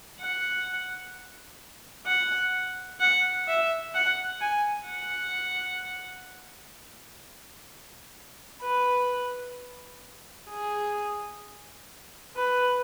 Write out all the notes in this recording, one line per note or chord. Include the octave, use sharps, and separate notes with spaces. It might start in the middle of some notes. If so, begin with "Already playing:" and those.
F#5
F#5
F#5
E5
F#5
G#5
F#5
B4
G#4
B4